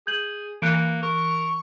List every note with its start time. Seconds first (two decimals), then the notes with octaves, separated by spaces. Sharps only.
0.07 G#4 G6 G#6 F#7
0.62 E3 A#3 F#6 C#7 D7
1.02 A#4 C#6